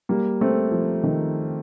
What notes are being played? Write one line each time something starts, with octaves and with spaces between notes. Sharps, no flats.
G3 A#3
A3 C4
F3
D#3